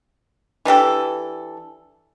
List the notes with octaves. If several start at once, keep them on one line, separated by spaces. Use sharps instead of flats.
E3 D4 G4 A4